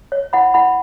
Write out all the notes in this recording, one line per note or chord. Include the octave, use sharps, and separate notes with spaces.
C#5
E4 F#5 B5
E4 F#5 B5